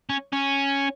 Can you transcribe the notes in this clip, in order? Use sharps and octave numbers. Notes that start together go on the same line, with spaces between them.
C#4
C#4